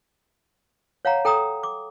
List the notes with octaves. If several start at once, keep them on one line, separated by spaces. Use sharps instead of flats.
C#5 F5 F#5 A#5
A4 G5 A#5 D#6
D6